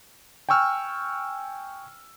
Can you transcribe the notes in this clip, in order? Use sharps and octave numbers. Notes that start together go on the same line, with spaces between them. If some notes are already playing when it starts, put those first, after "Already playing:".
G5 G#5 C#6 E6 F6